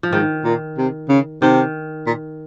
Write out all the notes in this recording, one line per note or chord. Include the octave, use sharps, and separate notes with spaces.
F3
G#2 D#3
A#2
C3
C#3
C3 D#3
A#2